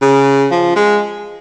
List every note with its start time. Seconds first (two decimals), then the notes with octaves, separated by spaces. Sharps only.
0.02 C#3
0.52 F3
0.76 G#3